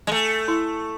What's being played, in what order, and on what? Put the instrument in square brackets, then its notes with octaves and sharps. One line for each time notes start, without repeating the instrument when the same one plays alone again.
[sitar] G#3
[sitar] A3 [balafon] A4
[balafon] E4